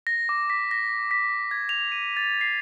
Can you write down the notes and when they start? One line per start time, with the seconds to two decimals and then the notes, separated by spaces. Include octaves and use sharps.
0.07 A#6
0.29 D6
0.50 B6
0.71 A#6
1.11 B6
1.51 G#6
1.69 F7
1.92 D#7
2.17 A6
2.41 C7